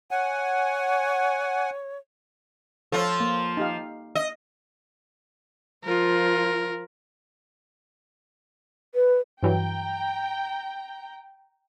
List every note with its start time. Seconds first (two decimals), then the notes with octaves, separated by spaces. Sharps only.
0.11 C#5 F#5 G#5
2.92 F3 F4 A4 C#5
3.20 A#3
3.57 D#4 G4 F5
4.15 D#5
5.84 F3 F4 A#4
8.95 B4
9.43 G2 E3 F#3 G5 A#5